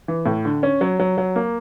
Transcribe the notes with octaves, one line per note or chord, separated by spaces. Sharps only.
E3
A2
D3
C#4
F#3
F#3
F#3
A#3